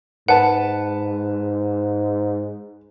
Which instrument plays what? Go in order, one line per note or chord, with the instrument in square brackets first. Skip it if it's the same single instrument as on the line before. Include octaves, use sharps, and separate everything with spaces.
[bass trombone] G#2 [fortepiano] B4 A5 [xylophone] F#5